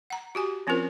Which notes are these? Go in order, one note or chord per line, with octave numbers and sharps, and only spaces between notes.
F#5 A#5
F#4 G4 G#5
F3 C4 C#4 F4 A#4 C5